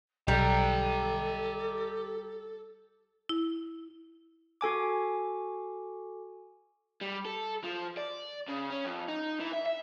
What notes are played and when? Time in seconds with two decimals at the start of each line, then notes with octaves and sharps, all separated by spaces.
0.28 B1 G3 G4 A4 A#5
3.29 E4
4.61 F#4 A4 G#5 D6
7.01 G3
7.26 A4
7.64 F3
7.97 D5
8.49 C#3
8.71 C#4
8.85 F2
9.08 D#4
9.40 E3
9.53 E5
9.66 E5